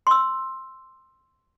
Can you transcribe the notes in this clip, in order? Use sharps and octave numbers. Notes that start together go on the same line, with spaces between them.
C6 E6